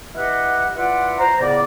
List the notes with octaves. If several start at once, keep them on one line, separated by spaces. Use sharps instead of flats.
E4 G4 B4 D#5 F5 F#5
E4 F4 B4 D5 F#5
C5 A#5
C#2 A2 C#3 B3 D5